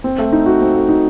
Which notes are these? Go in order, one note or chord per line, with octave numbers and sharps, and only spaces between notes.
C4
A3
D#4
F#4
C4
A3
D#4